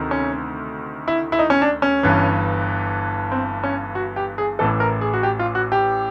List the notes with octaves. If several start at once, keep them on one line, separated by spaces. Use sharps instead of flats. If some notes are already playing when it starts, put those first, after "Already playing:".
Already playing: D2 C3 D#3
C#4
E4
E4
D#4
C#4
D4
C#4
G1 G2 E3
C4
C#4
F#4
G4
G#4
A1 A2 E3 A4
A#4
G#4
F#4
G4
F4
F#4
G4